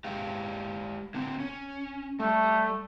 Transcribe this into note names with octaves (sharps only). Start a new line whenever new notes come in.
G#3 G4 F5
D3 C4
C#4
G3 A3